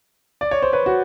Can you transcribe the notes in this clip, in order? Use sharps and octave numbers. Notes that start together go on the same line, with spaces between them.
D5
C#5
C5
B4 C#5
F#4